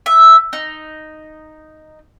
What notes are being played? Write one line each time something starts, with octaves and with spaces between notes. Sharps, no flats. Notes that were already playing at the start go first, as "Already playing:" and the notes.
E5
D#4